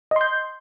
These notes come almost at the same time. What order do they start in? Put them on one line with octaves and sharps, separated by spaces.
D#5 C6 G6